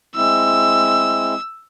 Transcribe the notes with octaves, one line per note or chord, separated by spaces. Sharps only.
G#3 C4 E4 E6